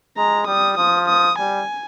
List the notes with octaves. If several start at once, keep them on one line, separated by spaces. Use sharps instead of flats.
G#3 A#5
G3 D#6
F3 D#6
D#6
G3 G#5